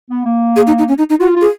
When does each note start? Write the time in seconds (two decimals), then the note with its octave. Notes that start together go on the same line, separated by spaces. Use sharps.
0.10 B3
0.25 A#3
0.56 G#4
0.67 D#4
0.78 D#4
0.88 C#4
0.98 D#4
1.10 D#4
1.19 F4 F#4
1.36 F4
1.41 G#4